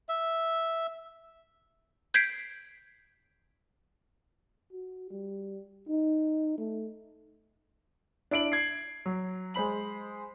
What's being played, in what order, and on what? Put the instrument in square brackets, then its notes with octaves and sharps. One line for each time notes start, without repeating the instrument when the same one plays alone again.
[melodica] E5
[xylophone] G6 G#6 B6 C7 D7
[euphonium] F#4
G3
D#4
A3
[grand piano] D4 E4 D7 F#7
G#6 C7
F#3
G#3 C5 B5 F#7